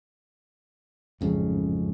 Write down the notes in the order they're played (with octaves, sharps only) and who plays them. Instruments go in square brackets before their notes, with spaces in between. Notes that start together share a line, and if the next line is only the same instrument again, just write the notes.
[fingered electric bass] A1 F2 G#2 C#3